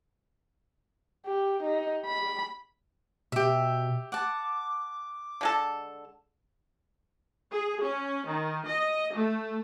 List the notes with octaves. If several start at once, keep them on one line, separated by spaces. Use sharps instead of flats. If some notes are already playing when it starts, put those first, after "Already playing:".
G4
D#4
B5
B2 G4 E5
F#5 A5 D6
D3 G#3 A4
G#4
C#4
D#3
D#5
A3